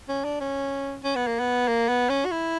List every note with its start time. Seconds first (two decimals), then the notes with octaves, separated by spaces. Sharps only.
0.09 C#4
0.24 D4
0.41 C#4
1.04 C#4
1.16 B3
1.27 A#3
1.39 B3
1.68 A#3
1.88 B3
2.09 C#4
2.25 F#4
2.31 E4